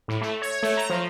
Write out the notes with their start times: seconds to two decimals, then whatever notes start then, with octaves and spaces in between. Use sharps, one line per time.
0.08 A2
0.21 A3
0.42 C#5
0.63 A3
0.77 A#5
0.90 F3